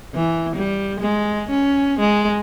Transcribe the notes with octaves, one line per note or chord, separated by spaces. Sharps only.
E3
G3
G#3
C#4
G#3